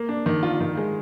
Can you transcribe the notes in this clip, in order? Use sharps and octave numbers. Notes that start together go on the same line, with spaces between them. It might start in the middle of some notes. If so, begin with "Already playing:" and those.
Already playing: A#3
D4
D#3
F4
D#3
G#3